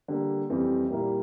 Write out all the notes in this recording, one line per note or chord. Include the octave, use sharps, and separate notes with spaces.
D3 G3 A#3
F2 E3 G3 C4
A#2 G3 A#3 E4